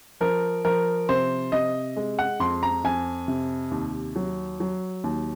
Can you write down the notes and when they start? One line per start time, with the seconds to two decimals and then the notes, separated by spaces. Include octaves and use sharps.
0.21 F3 A#4
0.65 F3 A#4
1.09 C3 C5
1.52 C3 D#5
1.96 G#3
2.19 F#5
2.40 F2 C6
2.63 A#5
2.84 F2 G#5
3.28 C3
3.71 D#2
4.16 F#3
4.60 F#3
5.04 D#2